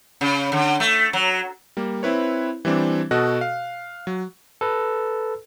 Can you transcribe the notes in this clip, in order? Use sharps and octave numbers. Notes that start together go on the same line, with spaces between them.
C#3
D3
A3
F#3
G3 A#3
C4 E4 B4 C#5
E3 G3 C4 D4
B2 F#4 A4 D#5 F#6
F5
F#3
A4 B4